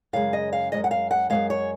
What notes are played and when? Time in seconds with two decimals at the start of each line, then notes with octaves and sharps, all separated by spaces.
0.13 F#2 C#3 G#3 F5
0.33 D#5
0.53 F5
0.72 C#3 G#3 D#5
0.77 F#2
0.84 F#5
0.91 F5
1.11 F#5
1.30 F#2 C#3 G#3 F5
1.50 C#5